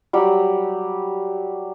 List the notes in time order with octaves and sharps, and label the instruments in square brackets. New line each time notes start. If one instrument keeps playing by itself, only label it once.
[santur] F#3 G3